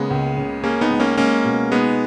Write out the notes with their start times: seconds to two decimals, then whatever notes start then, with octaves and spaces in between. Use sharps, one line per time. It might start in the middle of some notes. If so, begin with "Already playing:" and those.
Already playing: C#3 G#3 A#3 B3
0.10 C#2
0.37 C#3
0.64 A#3 C#4 G#4
0.81 B3 D#4
0.90 G#3
1.00 A#3 C#4
1.17 G#3 A#3 C#4
1.45 B2
1.71 G#3 B3 D#4